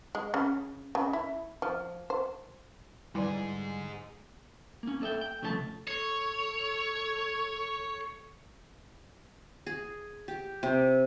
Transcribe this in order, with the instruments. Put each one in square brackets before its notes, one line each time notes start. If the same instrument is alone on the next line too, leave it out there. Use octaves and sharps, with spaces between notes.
[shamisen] G#3
C#3
C#3
E4
F3
C5
[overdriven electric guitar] G#2 G#4 [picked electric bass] D3 G3 [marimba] E4 B4 D5
[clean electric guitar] A#3 C#4
A#3 A4 D#5 E5 G5
G5
C2 C#3 F3 A3 A#4 A5
[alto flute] A4 [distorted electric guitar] C#5
[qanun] G#4
G4
C3